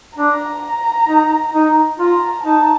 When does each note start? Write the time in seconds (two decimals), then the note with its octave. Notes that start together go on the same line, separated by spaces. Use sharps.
0.17 D4 A#5
1.08 D#4
1.54 D#4
1.99 F4 A#5
2.44 D#4 A5